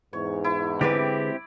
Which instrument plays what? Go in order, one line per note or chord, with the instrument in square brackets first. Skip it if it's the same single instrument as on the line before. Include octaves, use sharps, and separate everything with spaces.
[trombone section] E2 G#2 [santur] C#5
[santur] E4
[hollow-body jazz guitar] D3 G#3 B4 [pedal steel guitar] C4 E4 G4 [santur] D5